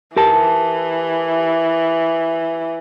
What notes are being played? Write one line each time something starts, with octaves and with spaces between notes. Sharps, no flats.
E3 G4 A#4 A5